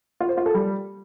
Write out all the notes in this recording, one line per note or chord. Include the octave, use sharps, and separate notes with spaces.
F4
C5
F4
A4
G3